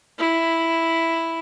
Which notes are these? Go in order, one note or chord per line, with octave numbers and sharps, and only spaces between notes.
E4